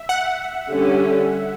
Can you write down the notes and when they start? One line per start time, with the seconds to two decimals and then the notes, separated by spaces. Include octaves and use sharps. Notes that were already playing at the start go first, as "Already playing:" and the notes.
Already playing: E5
0.09 F#5
0.71 D3 G3 C#4